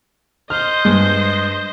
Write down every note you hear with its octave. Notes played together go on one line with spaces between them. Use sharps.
C5 D#5 F6
G2 G#3